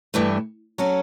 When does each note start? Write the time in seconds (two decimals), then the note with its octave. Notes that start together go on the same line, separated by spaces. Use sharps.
0.14 G2 E3 A3
0.78 F#3 C#4 F#4 A4